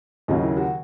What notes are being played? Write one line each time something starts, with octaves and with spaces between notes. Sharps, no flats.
D#2 C#3 F#3 A#3 D#4
E4
F#4